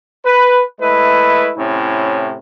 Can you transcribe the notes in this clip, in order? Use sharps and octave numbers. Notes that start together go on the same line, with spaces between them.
B4
G#3 A3 E4 B4
A2 C3 C#4 E4